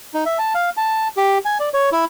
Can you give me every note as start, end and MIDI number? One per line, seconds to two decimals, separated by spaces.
0.14 0.24 63
0.26 0.38 76
0.39 0.53 81
0.55 0.70 77
0.77 1.08 81
1.17 1.38 67
1.45 1.58 80
1.60 1.69 74
1.74 1.90 73
1.92 2.05 64